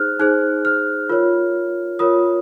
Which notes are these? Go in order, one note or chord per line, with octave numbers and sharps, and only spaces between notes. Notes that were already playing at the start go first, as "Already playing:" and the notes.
Already playing: D#4 G#4 C5 F6 F#6
D#4 G#4 C5 F#6
F6
F4 A#4 C#5
F4 A#4 C#5 D#6